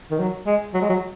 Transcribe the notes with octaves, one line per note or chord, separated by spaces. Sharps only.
D#3
F#3
G#3
F#3
G#3
F#3